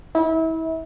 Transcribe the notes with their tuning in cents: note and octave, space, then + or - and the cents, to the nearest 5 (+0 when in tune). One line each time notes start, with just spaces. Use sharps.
E4 -35